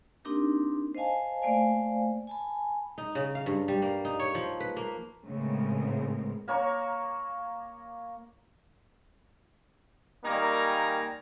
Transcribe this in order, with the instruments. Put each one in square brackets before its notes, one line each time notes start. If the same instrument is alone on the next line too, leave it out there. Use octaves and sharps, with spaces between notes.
[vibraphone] A#3 C4 D4 D#4 G4 A#4
C5 D#5 F5 G#5 A5
A3 A#3 C5 D5 F5 G#5
G#5 A5 B5
[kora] D#4
C#3
F5
G2
G3
A#3
D#4
C#5
F3
B4
A#3
[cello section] A2 C#3 G#3 B3 C4 A#4
[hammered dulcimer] A#3 C#5 A#5 C#6
[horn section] D#3 G3 A#3 D#4 G#5 A#5